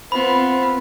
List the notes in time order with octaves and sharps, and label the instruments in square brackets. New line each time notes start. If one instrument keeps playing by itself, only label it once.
[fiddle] B3 F4 [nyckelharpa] C4 [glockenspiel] B5